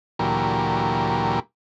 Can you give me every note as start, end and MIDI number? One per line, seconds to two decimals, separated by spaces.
0.19 1.40 38
0.19 1.40 46
0.19 1.40 52
0.19 1.40 54
0.19 1.40 67
0.19 1.40 70